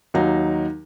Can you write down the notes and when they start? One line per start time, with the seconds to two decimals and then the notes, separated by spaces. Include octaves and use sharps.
0.14 D#2 F#3 D#4